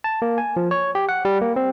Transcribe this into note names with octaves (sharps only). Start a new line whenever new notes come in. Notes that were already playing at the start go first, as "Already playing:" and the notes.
A5
A#3
G#5
F3
C#5
G4
F#5
G3
A#3
C4